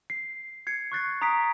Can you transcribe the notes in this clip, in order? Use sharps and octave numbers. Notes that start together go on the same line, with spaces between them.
C7
G#6 C7 C#7
C#6 F#6 A6 C7
A#5 D#6 A6 B6 D7